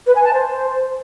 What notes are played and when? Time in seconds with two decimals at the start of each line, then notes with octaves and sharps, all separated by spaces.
0.06 B4
0.15 G#5
0.24 A5
0.33 C5